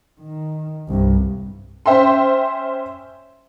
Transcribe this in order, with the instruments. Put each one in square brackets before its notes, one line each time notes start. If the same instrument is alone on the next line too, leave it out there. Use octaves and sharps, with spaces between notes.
[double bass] D#3
C2 G2
[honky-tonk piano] C#4 C5 E5 G5 C6